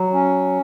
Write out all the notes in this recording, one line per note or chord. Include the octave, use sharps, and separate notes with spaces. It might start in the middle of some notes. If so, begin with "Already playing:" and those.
Already playing: F#3
C#4